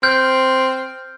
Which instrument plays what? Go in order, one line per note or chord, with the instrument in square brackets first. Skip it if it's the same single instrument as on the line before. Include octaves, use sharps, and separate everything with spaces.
[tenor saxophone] C4 [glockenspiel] F6 G6